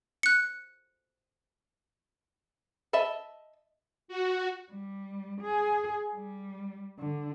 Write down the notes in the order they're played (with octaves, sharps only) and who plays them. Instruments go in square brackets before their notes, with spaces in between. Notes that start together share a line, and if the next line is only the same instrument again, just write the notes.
[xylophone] F#6 C#7
[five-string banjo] D#5 E5 A5 B5
[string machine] F#4
[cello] G3
G#4
G3
D3